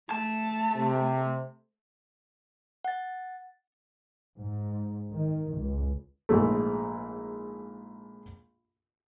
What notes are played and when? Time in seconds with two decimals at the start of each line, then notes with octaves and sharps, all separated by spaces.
0.11 A3 A5
0.76 C3
2.85 F#5 A6
4.38 G#2
5.12 D#3
5.58 C#2
6.29 A#1 G#2 G#3 A3